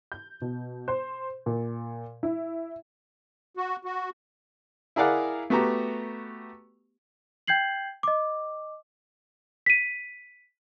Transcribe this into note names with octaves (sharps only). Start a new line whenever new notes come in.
G6
B2
C5
A#2
E4
F#4
F#4
E4 G#4 A#4 D5 F5 F#5
A3 B3 F#4 G4 A#5
G5 G6 G#6 C7 F#7
D#5 D6
B6 D#7